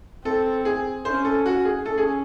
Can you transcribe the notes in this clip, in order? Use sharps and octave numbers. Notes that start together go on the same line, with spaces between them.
C4 A4
G#4
C#4 C5
A4
F#4
G#4
C#4 A4
G#4